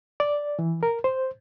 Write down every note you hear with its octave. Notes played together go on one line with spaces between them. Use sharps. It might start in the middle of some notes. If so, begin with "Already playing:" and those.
D5
E3
A#4
C5